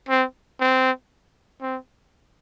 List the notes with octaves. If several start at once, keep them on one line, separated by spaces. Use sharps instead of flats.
C4
C4
C4